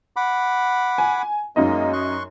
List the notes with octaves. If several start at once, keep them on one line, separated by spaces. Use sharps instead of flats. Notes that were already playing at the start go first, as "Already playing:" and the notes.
F#5 B5 D6
G#5
F#2 G#3 A#3 D#4 D#5
C6 C#6 F#6